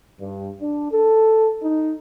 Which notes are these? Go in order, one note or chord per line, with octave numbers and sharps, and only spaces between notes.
G2
D4
A4
D#4